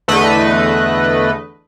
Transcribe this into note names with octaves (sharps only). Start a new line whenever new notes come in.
E2 D3 A3 B4 D#5